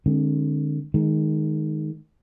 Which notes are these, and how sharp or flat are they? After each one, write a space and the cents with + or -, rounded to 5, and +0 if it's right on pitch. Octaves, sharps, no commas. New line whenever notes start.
D3 +40 G#3 +0 C4 +40
D#3 +0 G#3 +20